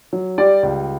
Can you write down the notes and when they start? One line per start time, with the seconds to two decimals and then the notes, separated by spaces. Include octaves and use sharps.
0.13 F#3
0.38 G3 D5
0.63 C#2